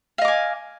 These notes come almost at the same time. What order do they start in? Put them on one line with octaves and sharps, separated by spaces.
F5 D#5 D6 G#5